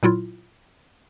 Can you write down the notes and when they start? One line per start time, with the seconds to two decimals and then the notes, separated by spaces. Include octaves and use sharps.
0.03 A#2 F#3 E4 F4